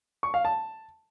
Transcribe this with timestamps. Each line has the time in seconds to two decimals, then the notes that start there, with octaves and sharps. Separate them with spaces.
0.23 C#6
0.34 F5
0.45 A5